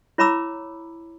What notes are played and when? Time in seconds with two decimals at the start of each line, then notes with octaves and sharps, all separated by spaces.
0.18 E4 C#5 A#5 B5 D6 E6